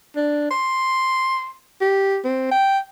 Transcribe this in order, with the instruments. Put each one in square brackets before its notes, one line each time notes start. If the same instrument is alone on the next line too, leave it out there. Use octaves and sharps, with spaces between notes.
[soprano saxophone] D4
C6
G4
C4
G5